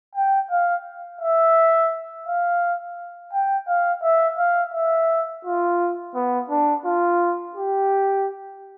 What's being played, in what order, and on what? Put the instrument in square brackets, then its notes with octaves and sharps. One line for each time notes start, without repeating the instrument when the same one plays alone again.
[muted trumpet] G5
F5
E5
F5
G5
F5
E5
F5
E5
F4
B3
D4
F4
G4